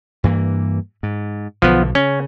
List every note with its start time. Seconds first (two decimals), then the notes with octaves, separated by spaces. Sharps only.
0.24 G2 E3 A#3
1.03 G#2
1.62 B1 D3 F3 B3
1.95 C#3 C#4